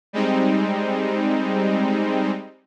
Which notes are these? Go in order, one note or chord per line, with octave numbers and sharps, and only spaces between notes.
G3 G#3 C4 D#4